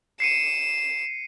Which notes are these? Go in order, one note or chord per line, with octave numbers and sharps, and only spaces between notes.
C7 C#7 D#7 E7